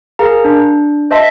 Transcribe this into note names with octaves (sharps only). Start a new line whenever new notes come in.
G#4 A#4 F5 A#5
D4
C5 D#5 E5 A5 C6 B6